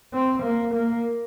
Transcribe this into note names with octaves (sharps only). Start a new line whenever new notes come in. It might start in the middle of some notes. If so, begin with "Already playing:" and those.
C4
A#3
A#3